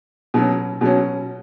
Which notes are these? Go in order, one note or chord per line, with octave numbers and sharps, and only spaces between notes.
B2 F#3 C#4
B2 F#3 C#4